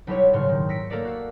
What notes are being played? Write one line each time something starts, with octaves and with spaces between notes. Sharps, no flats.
B1 G3 E4 G4 C#5
D#1 G#2 C#3 C#5 C6 F6
D#3
E6 A#6 B6 C#7 D7
A3 A#3 A4 A#4 D5 E5
F#4 F5 E6